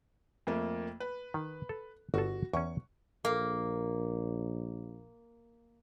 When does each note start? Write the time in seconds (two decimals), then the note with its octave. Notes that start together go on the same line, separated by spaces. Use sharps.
0.47 F2 A3 A#3
1.00 B4
1.34 D#3
1.69 A4
2.14 G1 F#4 A4
2.53 E2 C#4 C#6
3.25 A#1 A#3